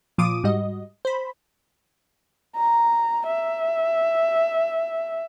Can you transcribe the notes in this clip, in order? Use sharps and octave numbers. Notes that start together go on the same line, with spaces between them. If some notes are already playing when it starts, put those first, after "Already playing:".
A#2 F3 F4 D6 D#6 D#7
G#2 G3 F#4 D#5
C5 B5
A#5
E5